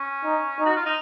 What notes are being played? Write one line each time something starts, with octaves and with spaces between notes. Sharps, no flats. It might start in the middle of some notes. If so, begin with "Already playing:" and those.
Already playing: C#4
D#4
D#4
F#4
F4
D#4